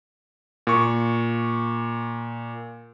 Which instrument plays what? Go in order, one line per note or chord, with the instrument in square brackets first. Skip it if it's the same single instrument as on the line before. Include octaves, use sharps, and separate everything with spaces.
[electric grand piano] A#2 C#6